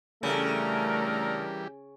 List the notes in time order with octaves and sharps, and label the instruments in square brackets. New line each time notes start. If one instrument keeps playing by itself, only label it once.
[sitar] C#3 [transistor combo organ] E3 G3 G4 [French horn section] A3 [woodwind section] D4 A4 A#4